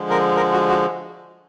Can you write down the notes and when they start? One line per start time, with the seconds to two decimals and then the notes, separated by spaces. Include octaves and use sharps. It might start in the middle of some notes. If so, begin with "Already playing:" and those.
Already playing: D3 F3 G#3
0.10 A#4
0.36 A#4
0.53 F#4
0.69 F#4